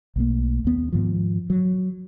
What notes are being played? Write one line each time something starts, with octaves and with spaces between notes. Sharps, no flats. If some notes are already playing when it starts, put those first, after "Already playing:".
B1 A3 A#3
D#2 B3
G#2 D#3 F3
F#3